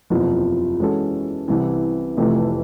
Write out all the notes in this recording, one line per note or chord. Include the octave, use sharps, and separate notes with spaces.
F#1 E2 C3 F3
E3 G#3 C#4 F#4 A4
C2 C3 E3
F1 F2 C3 E3 A3